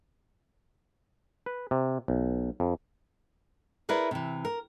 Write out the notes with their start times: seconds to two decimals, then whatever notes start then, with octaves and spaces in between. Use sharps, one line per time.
1.46 B4
1.71 C3
2.08 B1
2.60 F2
3.89 E4 G#4 A#4 B4 D5
4.11 C3 E3
4.45 A#4